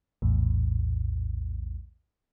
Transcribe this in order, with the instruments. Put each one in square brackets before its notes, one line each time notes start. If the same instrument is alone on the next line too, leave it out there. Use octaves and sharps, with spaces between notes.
[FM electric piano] A#1 E2 A2